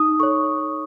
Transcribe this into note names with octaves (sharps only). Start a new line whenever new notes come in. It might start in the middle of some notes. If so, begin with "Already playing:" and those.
Already playing: D#4 D#6
A4 C#5 C#6